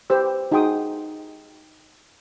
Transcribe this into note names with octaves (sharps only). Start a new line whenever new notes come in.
G4 B4 C5 E6
D#4 F#4 G#4 G5 C6 D#6